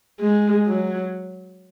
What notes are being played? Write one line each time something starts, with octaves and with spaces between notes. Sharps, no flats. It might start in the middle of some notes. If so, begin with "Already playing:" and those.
G#3
F#3